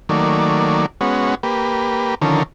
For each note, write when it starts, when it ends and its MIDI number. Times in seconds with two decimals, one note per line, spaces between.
0.09 0.86 51
0.09 0.86 54
0.09 0.86 57
0.09 0.86 58
0.09 0.86 74
1.01 1.35 56
1.01 1.35 59
1.01 1.35 61
1.01 1.35 66
1.43 2.15 58
1.43 2.15 67
1.43 2.15 71
2.22 2.43 50
2.22 2.43 51
2.22 2.43 53
2.22 2.43 61
2.22 2.43 69
2.22 2.43 70